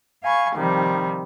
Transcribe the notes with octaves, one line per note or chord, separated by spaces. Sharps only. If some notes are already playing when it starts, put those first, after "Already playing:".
F5 G#5 B5 C#6
C3 D#3 F3 G3